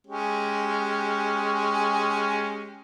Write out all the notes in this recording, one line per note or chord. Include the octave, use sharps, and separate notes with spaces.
G#3 C#4 G4